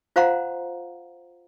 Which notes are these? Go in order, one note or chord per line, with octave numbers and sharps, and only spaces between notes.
F4 C5 F5 F#5 A#5 C6